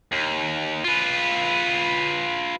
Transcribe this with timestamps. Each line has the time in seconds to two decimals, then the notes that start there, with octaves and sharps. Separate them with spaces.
0.12 D#2
0.84 F4 B4